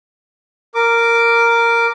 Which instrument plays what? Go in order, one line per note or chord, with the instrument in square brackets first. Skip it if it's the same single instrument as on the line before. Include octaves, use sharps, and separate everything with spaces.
[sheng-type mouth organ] A#4 D6